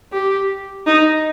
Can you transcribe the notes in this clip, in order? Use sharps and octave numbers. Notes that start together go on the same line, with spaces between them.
G4
D#4